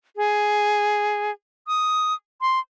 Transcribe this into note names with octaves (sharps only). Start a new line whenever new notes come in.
G#4
D#6
C6